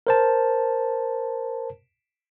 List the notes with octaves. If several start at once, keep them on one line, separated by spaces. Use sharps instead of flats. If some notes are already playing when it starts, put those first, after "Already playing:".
A#4 C5 A5